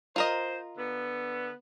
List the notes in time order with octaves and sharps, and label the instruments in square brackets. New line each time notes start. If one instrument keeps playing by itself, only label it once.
[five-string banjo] F4 A#4 D#5 [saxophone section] C5
[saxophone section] D3 B3